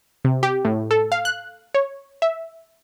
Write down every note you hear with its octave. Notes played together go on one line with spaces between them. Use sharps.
C3
G4
A2
A4
F5
F#6
C#5
E5